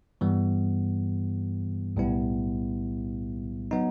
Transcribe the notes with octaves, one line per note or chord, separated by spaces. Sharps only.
G2 E3 G3 B3
B1 A2 G3 B3 E4
F#3 B3 D#4